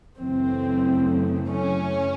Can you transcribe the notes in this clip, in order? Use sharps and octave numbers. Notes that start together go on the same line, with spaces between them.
F#2 C#3 E3 A3 C4
C#4